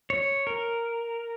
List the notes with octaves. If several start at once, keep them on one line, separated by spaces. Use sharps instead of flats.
C#5
A#4